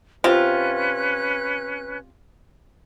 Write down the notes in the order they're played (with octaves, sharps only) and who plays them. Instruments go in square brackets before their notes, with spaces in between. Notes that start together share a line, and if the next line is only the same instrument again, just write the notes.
[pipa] C3 F4 [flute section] C#4 B4 F#6